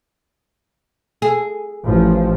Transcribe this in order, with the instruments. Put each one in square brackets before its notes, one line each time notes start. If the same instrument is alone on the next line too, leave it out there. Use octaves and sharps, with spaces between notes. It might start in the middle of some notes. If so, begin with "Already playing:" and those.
[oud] G#4
[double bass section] A1 F3